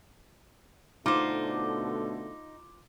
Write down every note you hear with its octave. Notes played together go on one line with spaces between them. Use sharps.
B2 D3 A3 D#4 F4 C5 D6